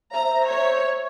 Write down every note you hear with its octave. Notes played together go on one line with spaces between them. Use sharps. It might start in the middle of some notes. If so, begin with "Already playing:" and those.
C5 E5 A#5
C#5